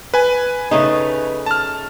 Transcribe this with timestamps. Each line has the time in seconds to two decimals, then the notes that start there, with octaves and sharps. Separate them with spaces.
0.14 B4 G#5
0.71 C#3 A3 D#4
1.46 A5 F6